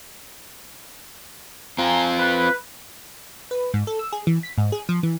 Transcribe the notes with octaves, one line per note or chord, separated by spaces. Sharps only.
C4 F4 G#5 A#5
B4
B4
G#2
A4
E6
G#4
E3
B6
G#2
G#4
F3
E3